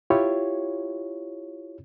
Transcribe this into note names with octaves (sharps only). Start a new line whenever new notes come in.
E4 F4 G4 C#5